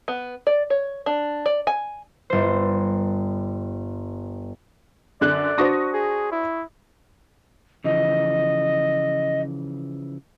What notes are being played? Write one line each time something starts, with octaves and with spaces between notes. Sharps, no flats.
B3
D5
C#5
D4
D5
G#5
G1 C5
F#2 D3 D5 F#6
D4 F#4 C5 C#6 D#6 A#6
G#4
E4
C#3 E3 F3 D#5